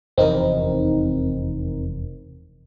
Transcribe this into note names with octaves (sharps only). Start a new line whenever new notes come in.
F1 E2 E3 C4 D#4 A#4